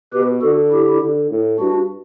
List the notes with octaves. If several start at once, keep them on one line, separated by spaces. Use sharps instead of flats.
B2 G4 B4
D3 F#4 A4
E4 G4
D3
A2
G2 D4 F#4